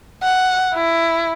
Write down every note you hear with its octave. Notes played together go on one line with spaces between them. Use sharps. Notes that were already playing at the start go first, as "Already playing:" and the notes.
F#5
E4